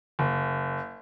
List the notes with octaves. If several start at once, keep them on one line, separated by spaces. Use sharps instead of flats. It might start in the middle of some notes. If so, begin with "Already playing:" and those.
F#1